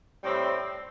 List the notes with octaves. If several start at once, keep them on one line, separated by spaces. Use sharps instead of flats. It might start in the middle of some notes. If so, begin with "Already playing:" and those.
A2 G3 C4